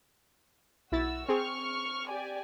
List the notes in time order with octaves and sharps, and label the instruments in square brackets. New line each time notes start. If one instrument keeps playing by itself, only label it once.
[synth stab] B1 E4 A6 [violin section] F#4 E6
[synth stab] C4 G#4 [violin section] C#6 F6
[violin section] G4 D5 G#5